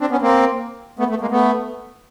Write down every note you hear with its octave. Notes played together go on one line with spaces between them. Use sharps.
C4 D4
B3 C#4
A#3 C4
A3 B3
A3
G#3 A#3
A3 B3